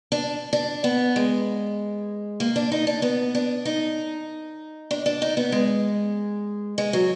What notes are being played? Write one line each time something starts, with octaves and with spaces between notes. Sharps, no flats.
D4
D4
B3
G#3
A#3
D4
D#4
D4
B3
D4
D#4
D4
D4
D#4
B3
G#3
G#3
F#3